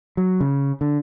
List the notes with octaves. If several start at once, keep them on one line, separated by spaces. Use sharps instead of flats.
F#3
C#3
D3